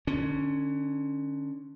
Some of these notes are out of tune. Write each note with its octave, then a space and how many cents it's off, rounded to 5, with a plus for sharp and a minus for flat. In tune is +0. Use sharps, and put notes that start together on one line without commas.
D3 +30 C#4 +0